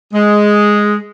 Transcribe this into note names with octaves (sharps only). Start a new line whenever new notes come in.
G#3